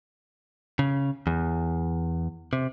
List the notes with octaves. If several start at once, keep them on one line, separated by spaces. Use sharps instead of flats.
C#3
E2
C3